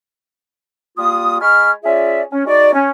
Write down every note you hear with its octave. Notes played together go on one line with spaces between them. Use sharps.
G3 A#3 F4 D#6
G#3 G#5 B5 C#6 F6
C#4 F4 G#4 D5 E5
C#4
G#3 D#4 F#4 D5
C#4